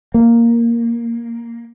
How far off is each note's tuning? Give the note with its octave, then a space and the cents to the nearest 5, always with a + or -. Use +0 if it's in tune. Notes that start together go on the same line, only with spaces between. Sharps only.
A#3 +0